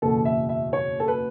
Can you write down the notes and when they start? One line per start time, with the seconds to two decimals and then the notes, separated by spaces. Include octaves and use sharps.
0.02 F#1 E2 B2 A4
0.25 E5
0.49 E5
0.73 C#5
1.00 A4
1.08 B4